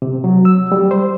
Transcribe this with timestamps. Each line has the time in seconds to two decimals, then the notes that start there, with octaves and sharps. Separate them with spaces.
0.02 C3
0.24 F#3
0.45 E6
0.72 G3
0.91 C5